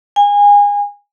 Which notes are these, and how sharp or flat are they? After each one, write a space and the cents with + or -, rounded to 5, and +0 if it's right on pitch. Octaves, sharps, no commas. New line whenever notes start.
G#5 -25